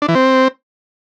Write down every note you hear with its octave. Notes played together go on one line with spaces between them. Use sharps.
D4
E3
C4